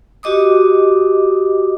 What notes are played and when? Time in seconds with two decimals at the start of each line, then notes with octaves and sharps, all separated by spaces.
0.23 F#4 G4 D#5 D6 D#6